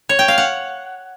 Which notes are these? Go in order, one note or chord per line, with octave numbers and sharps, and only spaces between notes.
C#5
G5
F5
F#5